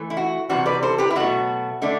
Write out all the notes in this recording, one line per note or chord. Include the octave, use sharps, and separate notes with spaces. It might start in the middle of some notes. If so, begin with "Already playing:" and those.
Already playing: E3 A3
E4
F#4
C3 E3 G3 F#4
B4 D5
A4 C5
G4 B4
E4
B2 F#3 A3 F#4
D3 A3 D4